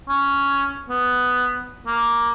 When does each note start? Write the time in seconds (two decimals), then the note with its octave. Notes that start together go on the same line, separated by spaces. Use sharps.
0.09 C#4
0.90 B3
1.87 A#3